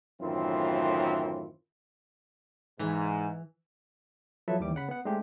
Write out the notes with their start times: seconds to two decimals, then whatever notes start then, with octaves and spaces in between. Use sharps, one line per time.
0.21 F#2 A2 D#3 E3 C4 F4
2.79 G#2 E3
4.48 F3 F#3 E4 A4 B4 E5
4.60 D#2 E3 G3 D6
4.75 C#3 F#5 B5
4.89 B3 F#5
5.05 G#3 A3 C4 D4 G4